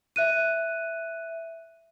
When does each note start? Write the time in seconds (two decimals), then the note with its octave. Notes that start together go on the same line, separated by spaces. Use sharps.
0.16 E5 F#6 D#7